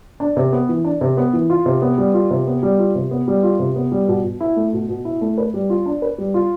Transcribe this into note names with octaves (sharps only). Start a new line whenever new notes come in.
D4
C3
B3
E3
D4
C3
B3
E3
F4
C3
B3
G3
F4
C3
B3
G3
F4
C3
B3
G3
F4
C3
B3
G3
B2
B2
E4
A3
B2
B2
E4
A3
B4
G3
F4
D4
B4
G3
F4